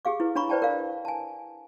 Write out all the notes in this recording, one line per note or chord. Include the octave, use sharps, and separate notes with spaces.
G4 G#4 F5 D6
E4 B4
D4 C#5 A#5 B5 C#6
B4 C5 D5 G5 A5
A#4 D5 F5
G#5 A5